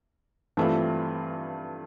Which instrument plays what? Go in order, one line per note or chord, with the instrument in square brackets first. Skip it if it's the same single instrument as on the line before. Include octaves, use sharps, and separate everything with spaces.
[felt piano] G2 E3 A3 C4 F4